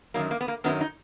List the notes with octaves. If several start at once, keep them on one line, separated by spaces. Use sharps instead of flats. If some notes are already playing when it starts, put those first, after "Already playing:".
F#2 D#3 F#3 A#3
A#3
B3
A#3
F#2 D#3 F#3 B3
D#4